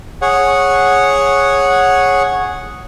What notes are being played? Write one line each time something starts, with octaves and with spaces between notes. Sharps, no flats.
G#4 C#5 F#5